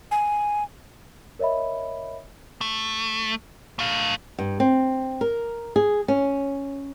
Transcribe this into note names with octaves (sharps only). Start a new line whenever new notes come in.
G#5
A#4 C#5 D#5 E5 B5
A3
A3 F5
G2
C4
A#4
G#4
C#4